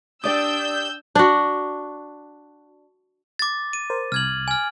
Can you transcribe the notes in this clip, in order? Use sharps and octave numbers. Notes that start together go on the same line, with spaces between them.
D4 G4 D5 G5 D#6 E6 G6
D4 F#4
D6 A6
D#7
A#4 C5
C2 F6 G#6 F#7
G#5 F6